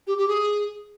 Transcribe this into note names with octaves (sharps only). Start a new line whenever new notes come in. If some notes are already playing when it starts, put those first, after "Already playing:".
G4
G4
G#4